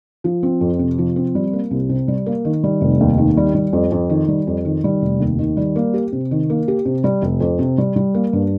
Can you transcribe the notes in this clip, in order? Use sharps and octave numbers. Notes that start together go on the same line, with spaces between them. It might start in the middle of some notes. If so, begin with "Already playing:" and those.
F3
C4
F2
C3
F3
C4
G3
A#3
C2
C3
G3
A#3
D#3
G3
F1
D#2
D#3
G3
G3
F2
F2
D#3
G3
F2
D#3
G3
F1
D#2
D#3
G3
A#3
G4
C3
D#3
A#3
G4
C3
G3
F1
F2
C3
G3
G3
A#3
G2